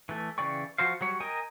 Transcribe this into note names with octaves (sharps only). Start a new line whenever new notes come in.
E3 A3
C#3 E3 D5 G5 C#6
F3 F#4 C5 F5
F#3 G3 C#5
A#4 D#5 G5 G#5 A#5